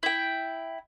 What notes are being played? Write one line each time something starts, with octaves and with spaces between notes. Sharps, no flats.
E4 G5